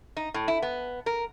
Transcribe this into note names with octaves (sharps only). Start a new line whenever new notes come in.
D#4
A2
E4
B3
A#4